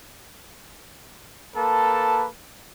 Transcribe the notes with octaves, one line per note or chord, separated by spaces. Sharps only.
A#3 A4 B4 A5